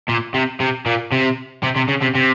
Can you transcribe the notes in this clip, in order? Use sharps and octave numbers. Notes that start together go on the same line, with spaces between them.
A#2
C3
C3
A#2
C3
C3
C3
C#3
C3
C3